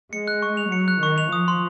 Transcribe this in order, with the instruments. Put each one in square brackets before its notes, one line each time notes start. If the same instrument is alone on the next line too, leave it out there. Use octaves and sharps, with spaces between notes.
[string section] G#3 [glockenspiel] C#7
[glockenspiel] F#6
C#6
F7
[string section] F#3 [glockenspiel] C#7
[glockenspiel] F#6
[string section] D#3 [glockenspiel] C#6
[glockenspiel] F7
[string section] F3 [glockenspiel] D#6
[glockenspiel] C6